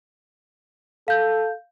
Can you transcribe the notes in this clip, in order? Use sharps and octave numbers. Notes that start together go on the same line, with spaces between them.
A4 F5 G6